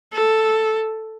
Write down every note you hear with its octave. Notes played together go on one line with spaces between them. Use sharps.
A4